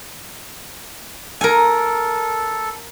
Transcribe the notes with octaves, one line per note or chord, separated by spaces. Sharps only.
A4 A#4 G#5